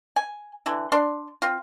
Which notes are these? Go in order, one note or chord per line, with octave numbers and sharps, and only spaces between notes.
G#5
D3 E3 E4
D4 D5 C6
C4 F4